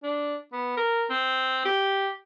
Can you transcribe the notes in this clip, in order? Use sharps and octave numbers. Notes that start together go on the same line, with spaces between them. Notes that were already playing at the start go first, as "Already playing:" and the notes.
D4
B3
A#4
C4
G4